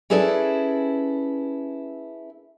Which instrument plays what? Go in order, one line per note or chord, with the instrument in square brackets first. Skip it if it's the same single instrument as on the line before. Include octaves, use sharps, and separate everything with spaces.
[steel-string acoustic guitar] C#4 E4 G#4 A4 B4 D5